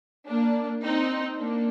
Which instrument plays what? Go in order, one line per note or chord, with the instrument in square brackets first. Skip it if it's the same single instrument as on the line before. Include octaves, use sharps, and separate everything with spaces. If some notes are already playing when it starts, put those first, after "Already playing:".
[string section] A#3 D4
C4 D#4
A#3 D4